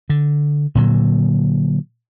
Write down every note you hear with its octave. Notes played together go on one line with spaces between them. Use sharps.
D3
A#2 D3 F#3